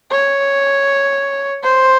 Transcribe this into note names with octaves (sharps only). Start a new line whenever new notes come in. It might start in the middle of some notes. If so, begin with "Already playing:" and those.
C#5
C5